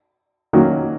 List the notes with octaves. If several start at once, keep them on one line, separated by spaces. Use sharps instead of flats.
D#3 F#3 A#3 C#4